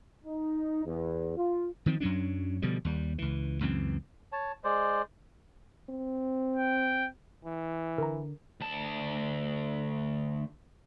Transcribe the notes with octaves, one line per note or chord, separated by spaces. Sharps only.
D#4
E2
F4
D#3 F3 C4
F#2 F#3 C#4 D4
B2 D3 F3 G3
D#2 G3
C#2 E3
C#2 F#2 E3 C4
C#5 A5
G#3 C5 D5
C4
G5
E3
D3 A#4 A#5
D2 A5